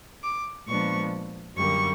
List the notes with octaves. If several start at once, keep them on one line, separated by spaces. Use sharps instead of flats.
D6
A#2 F3 G#3 B3 D4 C#6
F#2 D3 G3 A#3 C#6